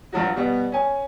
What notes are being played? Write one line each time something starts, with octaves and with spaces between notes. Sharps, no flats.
G2 F3 F#3 F#4
B2 G3 B3
C#4 G#5